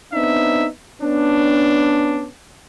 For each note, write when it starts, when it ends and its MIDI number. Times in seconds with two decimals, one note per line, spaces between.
0.13 0.67 59
0.13 0.67 60
0.13 0.67 62
0.13 0.67 63
0.13 0.67 76
1.02 2.27 59
1.02 2.27 61
1.02 2.27 62